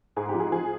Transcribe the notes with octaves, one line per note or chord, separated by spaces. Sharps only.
G#2 G#4
G4
F3
G#4
F3 G#4